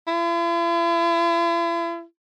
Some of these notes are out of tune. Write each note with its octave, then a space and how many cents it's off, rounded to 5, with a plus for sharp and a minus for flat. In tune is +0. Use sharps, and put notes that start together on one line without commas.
E4 +45